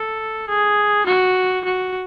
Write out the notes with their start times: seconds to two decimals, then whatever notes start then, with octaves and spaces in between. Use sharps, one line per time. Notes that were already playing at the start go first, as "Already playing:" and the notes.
Already playing: A4
0.49 G#4
1.07 F#4
1.65 F#4